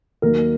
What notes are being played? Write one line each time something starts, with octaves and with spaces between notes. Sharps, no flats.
D#2 D#3 F#3 A#3 A#4